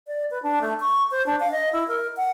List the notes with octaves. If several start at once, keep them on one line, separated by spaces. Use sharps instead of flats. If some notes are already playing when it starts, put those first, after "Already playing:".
D5
B4
D4
A3
C#6
C5
D4
F5
D#5
E4
A#4
F#5